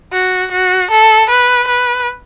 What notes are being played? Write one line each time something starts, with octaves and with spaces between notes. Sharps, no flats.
F#4
F#4
A4
B4
B4